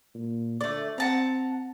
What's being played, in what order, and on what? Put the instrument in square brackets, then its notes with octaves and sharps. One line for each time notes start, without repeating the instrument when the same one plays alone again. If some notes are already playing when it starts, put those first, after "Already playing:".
[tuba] A#2
[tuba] D2 [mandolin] A3 D5
[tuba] C4 [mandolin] F#5 A5 A#5